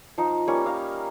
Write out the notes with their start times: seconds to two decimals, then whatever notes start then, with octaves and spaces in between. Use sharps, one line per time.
0.18 F3 D#4
0.47 G3 A#3 C#4 C#5
0.66 F5 A#5